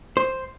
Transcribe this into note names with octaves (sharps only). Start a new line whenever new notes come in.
C5